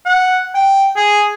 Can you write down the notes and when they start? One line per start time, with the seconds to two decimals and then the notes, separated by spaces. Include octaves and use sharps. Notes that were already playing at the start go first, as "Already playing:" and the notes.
0.06 F#5
0.54 G5
0.97 G#4